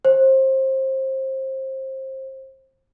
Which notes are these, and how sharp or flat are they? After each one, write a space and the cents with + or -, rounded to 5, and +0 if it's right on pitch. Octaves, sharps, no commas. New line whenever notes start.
C5 +25